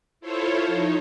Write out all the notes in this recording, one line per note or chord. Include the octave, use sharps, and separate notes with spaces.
E4 F4 A4 C5 C#5
F3 D#4 C#5